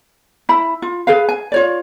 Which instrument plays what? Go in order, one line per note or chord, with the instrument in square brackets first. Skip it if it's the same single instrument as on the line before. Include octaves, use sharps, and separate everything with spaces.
[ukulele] E4 B5
F4
G#4 B4 F5
G#5
F4 C#5 D5